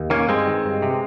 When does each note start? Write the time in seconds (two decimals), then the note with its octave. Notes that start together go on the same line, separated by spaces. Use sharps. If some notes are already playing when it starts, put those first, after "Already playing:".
Already playing: D#2
0.10 D#3 A#3 C#4
0.28 G2 G#3 C4
0.47 D#3
0.65 G2
0.82 C3